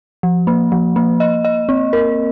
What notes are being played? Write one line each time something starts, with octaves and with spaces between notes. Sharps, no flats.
F3
A#3
F3
A#3
D#5
D#5
C4
A#4